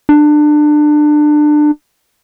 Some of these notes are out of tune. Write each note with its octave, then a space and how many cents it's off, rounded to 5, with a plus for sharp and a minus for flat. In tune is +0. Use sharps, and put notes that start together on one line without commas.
D4 +25